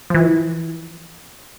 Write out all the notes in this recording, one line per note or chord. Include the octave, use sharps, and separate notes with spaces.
E3 F3